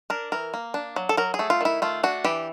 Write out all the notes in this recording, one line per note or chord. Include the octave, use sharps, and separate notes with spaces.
D4 A#4
E3 A#4
A#3
D4
F#3
A4
F#3 A#4
G#4
A3
F4
D#3 E4
A3 F4
D4 F#4
E3 G4